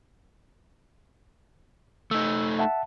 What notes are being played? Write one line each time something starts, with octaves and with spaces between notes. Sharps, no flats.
A3 D#4 E6
E5 F#5 A5